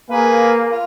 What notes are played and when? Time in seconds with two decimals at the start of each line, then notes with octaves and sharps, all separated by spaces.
0.10 A#3 G#4 B4
0.71 F4